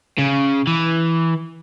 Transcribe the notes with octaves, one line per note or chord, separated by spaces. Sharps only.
C#3
E3